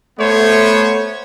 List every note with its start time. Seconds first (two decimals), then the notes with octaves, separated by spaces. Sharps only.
0.19 A3 B3 C5 C#5